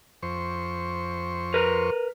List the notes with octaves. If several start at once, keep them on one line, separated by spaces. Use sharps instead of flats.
F2 C5 C#6
A#4 B4